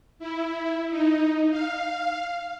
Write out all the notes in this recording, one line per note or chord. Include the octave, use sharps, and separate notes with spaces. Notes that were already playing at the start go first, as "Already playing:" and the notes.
E4
D#4
F5